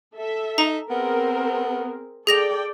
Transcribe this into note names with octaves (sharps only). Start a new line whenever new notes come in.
A4 E5
D#4 A#5
B3 C4 G#4 A#4
G#4 A4 D5 G5 A#6 F7